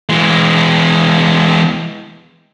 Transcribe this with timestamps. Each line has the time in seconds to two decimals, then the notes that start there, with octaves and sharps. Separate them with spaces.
0.09 E3 G#3